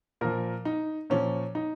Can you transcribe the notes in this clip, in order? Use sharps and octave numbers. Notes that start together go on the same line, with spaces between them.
A#2 F3 A#4
D#4
A#2 F3 C#4
D#4